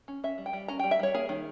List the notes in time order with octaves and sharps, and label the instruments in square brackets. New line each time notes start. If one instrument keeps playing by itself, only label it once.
[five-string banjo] C#4
C#4 E5
G3
G5
G3
C#4 A#5
G3 G5
E5
G3 C#5
A#3 G#4
D#3